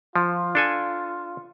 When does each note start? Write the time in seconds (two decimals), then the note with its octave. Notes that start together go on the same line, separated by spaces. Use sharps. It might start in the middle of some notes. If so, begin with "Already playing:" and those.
0.16 F3 F4
0.55 D4 A4 G#5